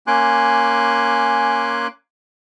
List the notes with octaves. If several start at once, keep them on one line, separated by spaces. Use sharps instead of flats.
A#3 C#4 G#5 C6 D6 F#6